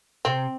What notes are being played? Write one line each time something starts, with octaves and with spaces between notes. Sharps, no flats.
C3 C4